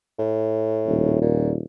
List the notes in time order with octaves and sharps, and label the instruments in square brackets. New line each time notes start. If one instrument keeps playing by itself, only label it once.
[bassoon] A2
[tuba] D#1
[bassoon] A#2